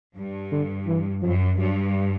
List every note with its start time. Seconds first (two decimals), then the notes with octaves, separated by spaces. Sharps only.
0.15 G2
0.51 D3
0.87 E3
1.22 F#2 F3
1.59 G2 F#3